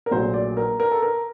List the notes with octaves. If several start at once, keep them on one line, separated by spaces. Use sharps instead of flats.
A#4
A#1 A#2 F#3 A3 C5
D5
A#4
A#4
A4
A#4